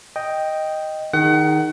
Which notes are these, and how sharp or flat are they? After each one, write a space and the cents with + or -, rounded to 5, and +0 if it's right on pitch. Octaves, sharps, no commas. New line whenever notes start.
D#5 +0 G5 +0
D#3 +0 G#4 -5 F#5 +30